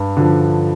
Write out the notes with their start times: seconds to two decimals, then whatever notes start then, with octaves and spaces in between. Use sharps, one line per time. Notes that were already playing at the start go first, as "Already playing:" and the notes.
Already playing: G2
0.17 D3 F3